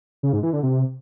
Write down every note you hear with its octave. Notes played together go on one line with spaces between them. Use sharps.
C#3
G#2
E3
D3
C3